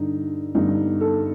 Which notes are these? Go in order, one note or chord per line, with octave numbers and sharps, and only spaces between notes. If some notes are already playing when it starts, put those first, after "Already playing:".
Already playing: G2 D3 D#4
G2 D3 D#4
A4